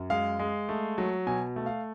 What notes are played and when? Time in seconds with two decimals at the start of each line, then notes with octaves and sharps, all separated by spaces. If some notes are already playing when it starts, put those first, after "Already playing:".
Already playing: F#2
0.10 G#3 F5
0.39 G#3
0.69 A3
0.98 F#3
1.27 B2 G#5
1.56 A3
1.66 F5